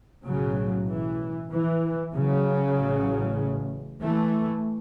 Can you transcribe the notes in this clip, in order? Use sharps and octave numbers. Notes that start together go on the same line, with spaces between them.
B1 A2 C#3 F#3
E3
E3
C#3 F#3
A1 A2
E3 A3